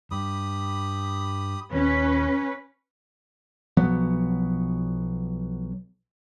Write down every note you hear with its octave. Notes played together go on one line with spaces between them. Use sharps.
G2 G4 B5 D#6
D#1 D#2 C#4 B4
B1 F3 F#3 B3